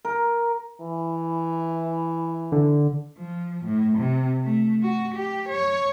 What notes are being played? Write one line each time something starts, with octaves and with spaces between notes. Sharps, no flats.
A#4
E3
D3
F3
A2
C3
A3
F#4
G4
C#5